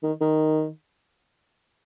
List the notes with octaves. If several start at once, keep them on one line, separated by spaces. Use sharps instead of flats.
D#3
D#3